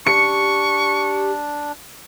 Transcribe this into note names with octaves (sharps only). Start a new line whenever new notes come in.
D4 G4 C#6 C#7